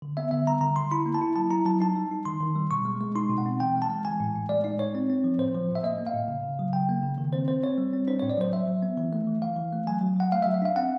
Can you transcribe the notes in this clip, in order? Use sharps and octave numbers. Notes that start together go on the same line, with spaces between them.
D3
B3 E5
D3 E5
G3 A#5
D3 A#5
D3 C6
E4 B5
A#3
A5
E4
F#3 A5
E4 A#5
F#3 A5
D#4 A5
G3
D#4
D#3 C6
D#3
G3
B2 C#6
G#3
G#3
D#4 C6
B2
F#5
C4
E3 G5
G#3
A5
G#3
E3 G#5
A2
A2
G#3 D5
D#4 D5
D#4 C#5
C4
C4
F3
A2 C5
F3
A2
E5
A#3 D#5
A#3
F5
A2
C#3
C#3
F#3
C#3 G5
A#3
C#3
D#3
C4 C5
C4 C5
C4 C#5
G3
C4
D4 C5
A2 C#5
D5
F#3 C5
F#3 E5
F#3
B3
E3
A3
E3
E3 F5
E3
A3
F#3 G#5
F#3
F#3 F#5
A3 F5
E5
F#3
E5
D4 F5
C4 F#5